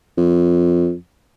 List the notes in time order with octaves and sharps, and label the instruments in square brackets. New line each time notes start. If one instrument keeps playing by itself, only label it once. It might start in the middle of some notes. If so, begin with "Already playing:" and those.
[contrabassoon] F2